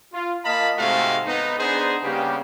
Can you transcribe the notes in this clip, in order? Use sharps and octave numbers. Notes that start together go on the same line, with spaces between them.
F4
A#3 D#5 F5 A5 B5
G#2 C3 G#3 A3 F#4 F5
B3 D#4
B3 D4 D#4 G#4 C5
C#3 G3 A#3 B3 G4